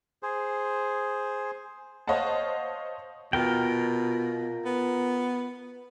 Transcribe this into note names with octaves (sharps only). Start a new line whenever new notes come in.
G#4 C5
C5 C#5 D#5 F5 F#5 A5
B2 F4 A#4 G5
B3